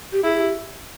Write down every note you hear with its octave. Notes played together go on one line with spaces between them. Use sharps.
G4
E4 G#4
G#4
G4